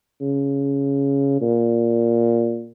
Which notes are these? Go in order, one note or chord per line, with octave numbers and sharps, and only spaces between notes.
C#3
A#2